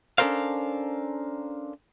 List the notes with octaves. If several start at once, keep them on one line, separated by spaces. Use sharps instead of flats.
C#4 D4 A4 A#4 C5 F5